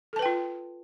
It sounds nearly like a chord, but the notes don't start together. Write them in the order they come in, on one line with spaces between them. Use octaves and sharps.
A4 A5 B4 G5 F4